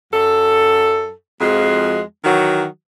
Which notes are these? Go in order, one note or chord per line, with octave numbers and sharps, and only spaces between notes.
F#2 A4
F2 F3 G#3 F#4 G#4
D#3 E3 F#3 F#4